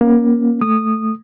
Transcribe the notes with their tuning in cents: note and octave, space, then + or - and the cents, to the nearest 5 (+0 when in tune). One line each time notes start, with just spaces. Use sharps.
A#3 +20 C#4 +0
A3 +0 D#6 -15